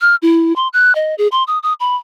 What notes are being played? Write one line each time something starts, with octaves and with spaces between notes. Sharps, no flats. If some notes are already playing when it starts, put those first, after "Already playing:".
F6
E4
C6
F#6
D#5
G#4
C6
D#6
D#6
B5